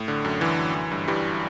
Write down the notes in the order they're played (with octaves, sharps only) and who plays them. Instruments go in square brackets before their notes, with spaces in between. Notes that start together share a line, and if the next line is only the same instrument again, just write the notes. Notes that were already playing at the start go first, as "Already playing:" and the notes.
Already playing: [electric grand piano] A2
D3
F#2
D3 E3
F#2
E3
G2
G2 E3 G3